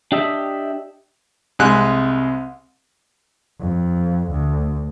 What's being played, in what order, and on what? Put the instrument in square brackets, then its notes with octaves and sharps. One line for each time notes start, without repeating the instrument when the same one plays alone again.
[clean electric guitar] D4 G4 D#5 E5
[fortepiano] C2 C3 G#3 F#6
[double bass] F2
D2